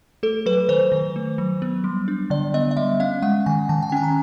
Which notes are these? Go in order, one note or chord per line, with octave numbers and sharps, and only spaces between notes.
A3 A4
F#3 B4
D#3 C5
D#3
A3
F#3
B3
G3
D4
D3 D5
B3 D#5
D#5
G3 E5
C#4 F5
G#3 F#5
D#3 G#5
D#3 A5
G5
G#5
C#4 A5
A#5